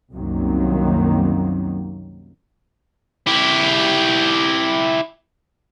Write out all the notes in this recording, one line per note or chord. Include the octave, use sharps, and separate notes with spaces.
C2 F#2 D#3 F#3 A#3 C4
E4 G4